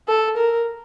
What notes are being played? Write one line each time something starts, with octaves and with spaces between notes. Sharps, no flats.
A4
A#4